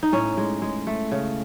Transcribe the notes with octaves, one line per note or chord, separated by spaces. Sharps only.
D#4
A2 C#4
G#3
G#3
A3
C#3